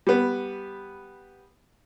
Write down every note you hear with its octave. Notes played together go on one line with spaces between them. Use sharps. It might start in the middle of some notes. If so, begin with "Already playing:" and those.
G3 B3